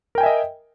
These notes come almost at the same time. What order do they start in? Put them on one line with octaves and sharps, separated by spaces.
A#4 G5 G#5 E5 D#5